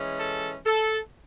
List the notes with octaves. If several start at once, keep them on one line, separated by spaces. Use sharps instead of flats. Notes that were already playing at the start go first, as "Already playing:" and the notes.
Already playing: E3 G#3 C#4
A4
A4